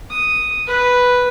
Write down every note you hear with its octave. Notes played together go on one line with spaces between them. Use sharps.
D#6
B4